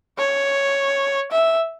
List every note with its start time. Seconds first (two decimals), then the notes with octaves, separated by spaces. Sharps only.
0.18 C#5
1.32 E5